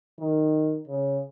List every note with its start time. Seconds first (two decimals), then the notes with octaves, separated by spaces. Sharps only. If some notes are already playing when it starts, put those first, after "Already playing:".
0.20 D#3
0.88 C#3